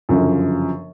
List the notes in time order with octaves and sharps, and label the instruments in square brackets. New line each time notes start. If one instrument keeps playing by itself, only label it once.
[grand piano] G1 F#2 C#3 F3